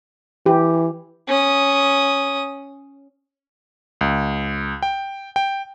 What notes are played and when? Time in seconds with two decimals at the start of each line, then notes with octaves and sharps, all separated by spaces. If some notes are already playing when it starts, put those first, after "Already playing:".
0.46 E3 G4
1.28 C#4 D#6
4.01 C#2
4.83 G5
5.36 G5